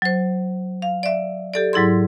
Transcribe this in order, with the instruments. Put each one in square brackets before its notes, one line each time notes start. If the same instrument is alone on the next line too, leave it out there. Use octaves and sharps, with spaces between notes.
[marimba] F#3 C5
F5
D5 E5
G4 A4 D5
G#2 F#3 E4 G#4 C6